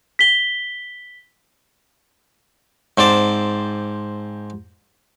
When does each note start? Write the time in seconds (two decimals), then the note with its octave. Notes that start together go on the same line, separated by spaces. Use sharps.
0.19 B6 G7
2.98 G#2 C4 C5 D5 A5